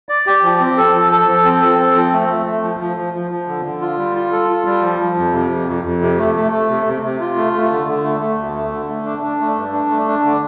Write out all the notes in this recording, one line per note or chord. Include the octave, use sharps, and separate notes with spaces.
D5
G4
F3
C4
A4
F3
A4
F3
C4
A4
C4
F3
A3
A3
A3
F3
F3
F3
F3
F3
D3
D3
F4
G3
F4
A4
F4
G3
F3
F3
F2
C3
F2
F2
F2
C3
A3
A3
A3
C3
C3
C3
F4
A3
A3
D3
D3
A3
A3
D2
A3
D3
A3
D4
D4
A3
G2
D4
A3
D4
D3